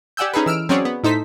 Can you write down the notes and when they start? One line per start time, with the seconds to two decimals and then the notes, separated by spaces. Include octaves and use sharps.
0.17 G4 D5 F#5 G#5 E6 G6
0.34 C#4 D#4 G#4 A4 B4
0.46 E3 E6 F6 D7
0.69 F#3 C4 C#4 G#4 C#5 D5
0.85 B3
1.04 A2 D#4 A4 C5 B6